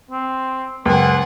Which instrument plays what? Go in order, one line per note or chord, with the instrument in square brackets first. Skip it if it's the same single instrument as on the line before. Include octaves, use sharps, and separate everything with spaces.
[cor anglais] C4
[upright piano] C#2 [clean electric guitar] F#2 [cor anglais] C5 [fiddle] F#5 G#5